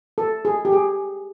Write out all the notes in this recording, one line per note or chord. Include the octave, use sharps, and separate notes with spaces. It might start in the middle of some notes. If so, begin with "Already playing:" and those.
A4
G#4
G4
G#4